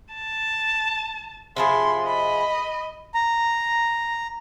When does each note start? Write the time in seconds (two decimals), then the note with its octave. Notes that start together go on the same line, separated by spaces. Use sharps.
0.14 A5
1.56 C3 F3 G#4 B5 C6
2.06 D#5 B5
3.14 A#5